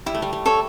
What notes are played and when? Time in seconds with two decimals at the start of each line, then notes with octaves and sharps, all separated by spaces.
0.06 G3 E4
0.15 A3
0.22 G3
0.33 G3
0.46 A4 C#5